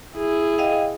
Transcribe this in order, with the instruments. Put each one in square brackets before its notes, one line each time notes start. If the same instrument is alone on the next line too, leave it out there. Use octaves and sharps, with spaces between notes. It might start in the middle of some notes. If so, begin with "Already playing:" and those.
[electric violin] E4 G#4
[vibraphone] D#5 F5 G5